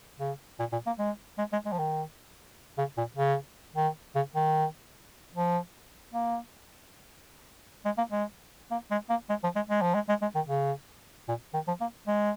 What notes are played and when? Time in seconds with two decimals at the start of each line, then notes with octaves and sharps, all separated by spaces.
0.20 C#3
0.59 A#2
0.72 A#2
0.87 A#3
0.99 G#3
1.38 G#3
1.53 G#3
1.66 G#3
1.72 F3
1.78 D#3
2.78 C#3
2.97 A#2
3.17 C#3
3.76 D#3
4.15 C#3
4.35 D#3
5.34 F3
6.14 A#3
7.85 G#3
7.98 A#3
8.12 G#3
8.71 A#3
8.91 G#3
9.10 A#3
9.29 G#3
9.43 F3
9.56 G#3
9.69 G#3
9.82 F3
9.95 G#3
10.09 G#3
10.22 G#3
10.35 D#3
10.48 C#3
11.28 A#2
11.54 D#3
11.67 F3
11.81 A#3
12.07 G#3